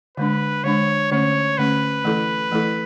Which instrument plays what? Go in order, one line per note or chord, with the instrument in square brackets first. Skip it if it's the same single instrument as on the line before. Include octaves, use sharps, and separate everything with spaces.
[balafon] D3 G#3 D4 [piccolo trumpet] B4
[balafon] D3 G#3 D4 [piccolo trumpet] C#5
[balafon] D3 A3 C#4 [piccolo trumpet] C#5
[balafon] D3 A3 C#4 [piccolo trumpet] B4
[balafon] E3 A3 E4 A4
E3 A3 E4 A4